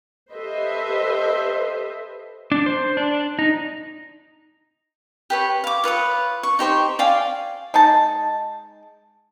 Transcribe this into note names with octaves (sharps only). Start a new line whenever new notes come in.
G4 A4 B4 C5 D#5 E5
D4
C5
D4
D#4
G4 B4 C#5
F5 D6
F4 B4 C#5 D#6
C#6
D#4 G4 C5 C#6
D5 F5 G5 G#5
G#3 D#4 A5